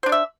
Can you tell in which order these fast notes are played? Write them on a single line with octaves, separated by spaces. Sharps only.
C5 D4 D5 E5